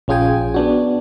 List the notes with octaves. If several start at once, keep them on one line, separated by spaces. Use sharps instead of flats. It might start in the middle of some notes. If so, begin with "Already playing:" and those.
A#1 C#4 F4 G#4 G5 G#5
B3 D4 F#4